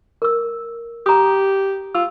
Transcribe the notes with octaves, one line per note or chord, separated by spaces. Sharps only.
A#4 E6
G4 A#5 D#6
F4 E6